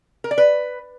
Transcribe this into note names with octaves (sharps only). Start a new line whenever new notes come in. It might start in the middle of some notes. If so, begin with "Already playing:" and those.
A#4
D5
B4